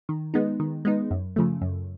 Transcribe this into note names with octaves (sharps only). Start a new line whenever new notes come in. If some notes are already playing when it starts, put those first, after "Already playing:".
D#3
G#3 B3 D#4
D#3
G#3 B3 D#4
F#2
C#3 F3 A3
F#2